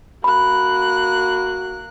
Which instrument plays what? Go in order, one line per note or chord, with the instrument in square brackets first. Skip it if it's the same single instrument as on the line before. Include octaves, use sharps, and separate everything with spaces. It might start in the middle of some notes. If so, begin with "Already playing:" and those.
[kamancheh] A#3 F#6 [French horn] F#4 [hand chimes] B5